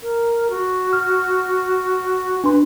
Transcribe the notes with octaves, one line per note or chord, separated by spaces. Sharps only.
A#4
F#4
F6
D4 B4 C6